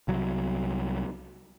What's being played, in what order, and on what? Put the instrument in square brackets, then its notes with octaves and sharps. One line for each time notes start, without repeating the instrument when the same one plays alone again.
[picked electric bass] C2 F#3